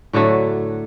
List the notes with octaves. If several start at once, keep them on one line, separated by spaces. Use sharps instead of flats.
A2 D3 F#3 A3